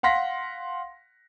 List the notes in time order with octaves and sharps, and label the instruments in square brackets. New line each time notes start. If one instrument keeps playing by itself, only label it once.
[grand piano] F5 F#5 C6 A#6 B6